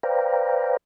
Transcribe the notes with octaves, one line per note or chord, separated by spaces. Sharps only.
B4 C5 D5 F5 G5 A#5